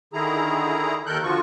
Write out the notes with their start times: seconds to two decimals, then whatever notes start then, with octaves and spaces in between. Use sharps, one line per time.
0.13 D3 D#3 E4 G#4 A#5
1.06 D#2 D#3 A4 A#4 F#6 G6
1.23 D3 F3 F4 F#4 C#6